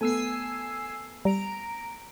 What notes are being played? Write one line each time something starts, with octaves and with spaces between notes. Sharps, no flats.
A3 B3 G#5 E6 C7
G3 A#5 D7